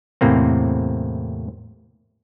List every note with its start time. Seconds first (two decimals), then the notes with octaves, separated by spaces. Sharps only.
0.21 E2 A2 C3 A#3 C4